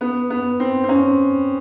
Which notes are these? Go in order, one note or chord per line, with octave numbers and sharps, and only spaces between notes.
B3
B3
C4
C4
C#4